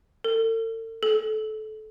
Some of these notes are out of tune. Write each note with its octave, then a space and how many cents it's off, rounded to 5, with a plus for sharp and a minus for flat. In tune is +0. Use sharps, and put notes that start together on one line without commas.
A4 +40
A4 -25